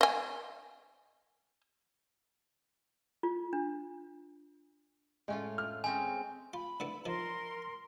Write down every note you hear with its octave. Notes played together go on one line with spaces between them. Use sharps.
D#5 G#5
F4
D4
A2 G#3 C#4 F4
F6
G#3 C4 C#4 G#5
F4 B5
D3 B3 E4
D#3 F3 A#4 C6